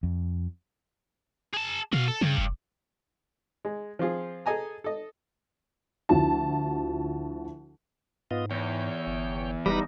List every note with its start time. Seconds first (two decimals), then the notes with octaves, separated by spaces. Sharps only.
0.03 F2
1.54 G#4 A5
1.93 B2 F#4 F5
2.08 A4
2.21 G2 C#3
2.38 F1
3.65 G#3
3.99 F3 C4 F4 G#4
4.46 G#4 A4 D#5 G#5 A#5
4.84 A4 D#5
6.09 D2 F3 E4 F#4 A5
8.31 G#2 B3 F4 D#5
8.51 E2 C#5 G5
9.07 G1
9.66 F1 G3 D#4 B4 B5 A#6